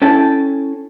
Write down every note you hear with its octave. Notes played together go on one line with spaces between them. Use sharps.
C#4 E4 A4 G5 A5